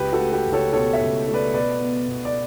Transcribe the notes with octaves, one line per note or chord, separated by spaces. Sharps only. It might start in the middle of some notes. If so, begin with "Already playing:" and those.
Already playing: C#2 G4 B4
F#4 A4
A3
G4 B4
C#2
A4 C#5
B2 A4 C#5
C#5 E5
C#2
A3
B4 D5
B2 B4 D5
B3
B2
D5